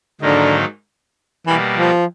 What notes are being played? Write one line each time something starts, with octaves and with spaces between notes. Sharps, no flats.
G#2 D3 D#3 F#3 A#3 D#4
B2 E3 G3 A#3
F3